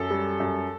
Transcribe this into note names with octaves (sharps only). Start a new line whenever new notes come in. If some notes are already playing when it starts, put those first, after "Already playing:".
Already playing: F#2 A4
G3
F#2